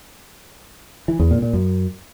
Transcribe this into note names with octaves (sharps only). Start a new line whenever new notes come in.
E3
E2
A#2
A#2
F#2